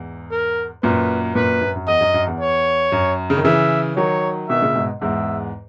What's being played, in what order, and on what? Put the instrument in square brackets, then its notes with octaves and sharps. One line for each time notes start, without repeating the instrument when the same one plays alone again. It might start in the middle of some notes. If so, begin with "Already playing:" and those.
Already playing: [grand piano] E2 G#2
[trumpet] A#4
[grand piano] F#2 A#2 [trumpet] B4
[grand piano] F#2 A#2 [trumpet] B4
[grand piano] F#2
F#2
[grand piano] E2 [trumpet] D#5
[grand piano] F#2
F#2
E2
[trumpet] C#5
[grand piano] F#2
C#3
D#3
[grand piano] C#3 E3 [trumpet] E5
[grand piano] D#3 F#3 [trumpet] C#5
[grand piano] B2 D#3 [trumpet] E5
[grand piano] A#2 C#3
G#2 B2
[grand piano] E2 G#2 [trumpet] E5